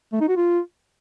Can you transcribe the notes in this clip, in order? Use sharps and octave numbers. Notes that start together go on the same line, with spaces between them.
A3
D#4
F#4
F4